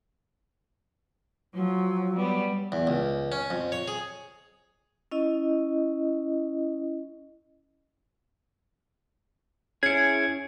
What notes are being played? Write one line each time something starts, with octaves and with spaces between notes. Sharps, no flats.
F3 F#3
G3 B3
E2
C#2
C#4
F2
C#5
G#4
C#4 E4 D#5
C#4 E4 G#4 G#6 C#7